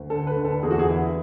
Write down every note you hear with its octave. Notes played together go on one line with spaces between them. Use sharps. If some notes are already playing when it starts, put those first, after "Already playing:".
Already playing: D2
D3 A4
B4
D3
A4
E2 G#4
F#4
G#4
E3 E4